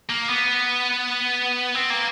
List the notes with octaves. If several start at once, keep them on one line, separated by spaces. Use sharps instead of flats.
A#3
B3
C4
A#3